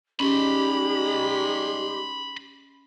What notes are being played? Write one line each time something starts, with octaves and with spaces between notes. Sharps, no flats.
G3 G#3 C#4 D#4 G4 B5 C6